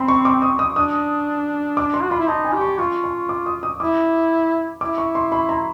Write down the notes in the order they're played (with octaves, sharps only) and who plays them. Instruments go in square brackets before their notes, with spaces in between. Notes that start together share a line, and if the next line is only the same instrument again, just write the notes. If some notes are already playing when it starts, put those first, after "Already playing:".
Already playing: [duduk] C4 [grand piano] B5 C6
[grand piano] C#6
D6
D#6
D#6
[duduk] D4 [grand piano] D#6
[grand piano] D6
C6
[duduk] F#4
[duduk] F4 [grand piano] B5
[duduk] E4
[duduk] D#4 [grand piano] A5
[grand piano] G#5
[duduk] G4
[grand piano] C#6
[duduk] F4 [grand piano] C#6
[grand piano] C#6
D6
D#6
D#6
[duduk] E4 [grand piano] D6
[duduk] E4 [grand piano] D6
[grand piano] C#6
C6
B5
A#5